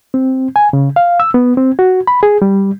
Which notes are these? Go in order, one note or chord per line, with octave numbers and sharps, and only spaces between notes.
C4
G#5
C#3
F5
E6
B3
C4
F#4
B5
G#4
G3